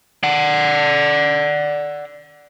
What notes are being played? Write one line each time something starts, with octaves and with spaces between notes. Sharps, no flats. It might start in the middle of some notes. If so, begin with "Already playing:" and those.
D5 F#5